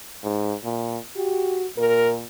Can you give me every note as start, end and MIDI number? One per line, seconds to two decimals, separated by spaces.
0.23 0.54 44
0.64 0.98 46
1.16 1.66 66
1.16 1.64 67
1.77 2.26 46
1.77 2.14 70